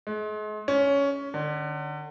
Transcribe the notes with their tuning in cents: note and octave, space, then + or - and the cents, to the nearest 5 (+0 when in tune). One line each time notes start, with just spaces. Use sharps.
G#3 +40
C#4 +15
D3 +35